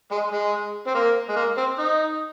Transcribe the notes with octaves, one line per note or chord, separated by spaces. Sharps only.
G#3
G#3
C4
A#3
G#3
A#3
C4
D#4